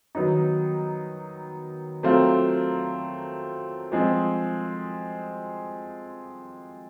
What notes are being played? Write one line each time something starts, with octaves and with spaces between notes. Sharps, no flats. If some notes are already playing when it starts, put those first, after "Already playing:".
D#3 F#3 B3 D#4
F#3 A3 C4 F4 A#4
F3 G#3 C4